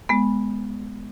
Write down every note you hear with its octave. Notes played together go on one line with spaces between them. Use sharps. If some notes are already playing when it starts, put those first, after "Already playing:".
G#3 B3